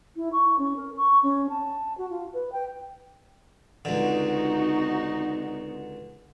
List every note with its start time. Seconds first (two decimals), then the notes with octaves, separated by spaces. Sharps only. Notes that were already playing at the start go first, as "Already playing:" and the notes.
0.16 E4
0.32 C#6
0.58 C#4
0.76 A#4
0.97 C#6
1.22 C#4
1.49 A5
1.97 F#4
2.10 F4
2.33 B4
2.52 G5
3.85 C#2 D3 C4 D#4 F#4